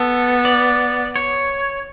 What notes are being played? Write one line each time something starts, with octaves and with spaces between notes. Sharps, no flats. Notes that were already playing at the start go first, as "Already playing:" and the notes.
Already playing: B3 A4
D5
C#5